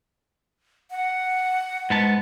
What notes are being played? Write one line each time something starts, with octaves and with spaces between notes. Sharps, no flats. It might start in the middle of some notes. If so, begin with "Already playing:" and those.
F#5
G#2 B3 A5